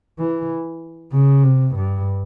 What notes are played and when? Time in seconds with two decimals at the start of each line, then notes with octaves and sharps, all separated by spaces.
0.19 E3
1.13 C#3
1.44 C3
1.76 G2